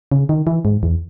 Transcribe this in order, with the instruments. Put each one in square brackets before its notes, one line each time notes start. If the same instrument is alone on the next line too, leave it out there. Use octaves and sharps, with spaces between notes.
[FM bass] C#3
D#3
E3
G#2
E2